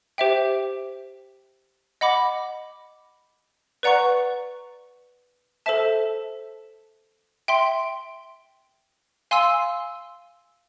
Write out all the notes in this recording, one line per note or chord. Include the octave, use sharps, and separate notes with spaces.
G4 C5 E5 G5
D#5 F#5 B5 D6
B4 D5 F#5 A#5 C#6
A4 C5 E5 A5
E5 G5 C6
F5 G#5 C6 E6